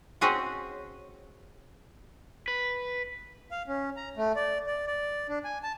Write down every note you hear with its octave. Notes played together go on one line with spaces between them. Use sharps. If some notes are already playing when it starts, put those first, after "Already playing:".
C4 C#4 F#4 G#4 D#5 F#5
B4
F5
C#4
A#5
A3
D5
D5
D5
D4
G#5
A5